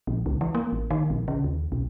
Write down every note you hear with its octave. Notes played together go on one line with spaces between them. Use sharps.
A#1
C#2
E3
A#3
A1
D#3
A#1
C#3
D#2
B1